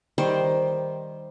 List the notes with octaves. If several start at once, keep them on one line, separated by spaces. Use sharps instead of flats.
D#3 G3 C5